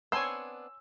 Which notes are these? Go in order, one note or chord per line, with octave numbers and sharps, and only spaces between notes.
B3 C4 D4 C#5 G#5 C6 E6